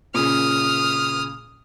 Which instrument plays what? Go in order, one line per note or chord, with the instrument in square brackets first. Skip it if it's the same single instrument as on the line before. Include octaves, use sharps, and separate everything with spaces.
[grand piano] A#2 C#3 [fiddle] D#6 F6